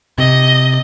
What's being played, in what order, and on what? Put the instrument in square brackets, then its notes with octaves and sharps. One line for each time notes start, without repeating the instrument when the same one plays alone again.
[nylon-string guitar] C3 [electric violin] D#5